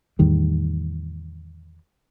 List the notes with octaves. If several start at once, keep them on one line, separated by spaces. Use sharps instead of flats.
E2 A2 D#3 G3